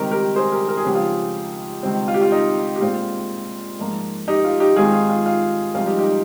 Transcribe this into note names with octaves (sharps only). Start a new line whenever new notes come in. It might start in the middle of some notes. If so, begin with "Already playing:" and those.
Already playing: C#2 C3 D#3 G3 C4 G4 A#4
G4 A#4
G#4 C5
G4 A#4
A#4
G#4
C#2 C#3 F3 G#3 C4 G4
F4 G#4
C#2 C3 D#3 G3 C4
F4
G4
F4
D#4
G4
A#2 G#3 C4 F4
G#2 F3 A#3
D#4 G4
F4
D#4 G4
G#2 D#3 G#3 C4 F4 G#4
F4
F4
F4
C2 C3 F3 G#3 C4 F4
D#4 G4
D#4 G4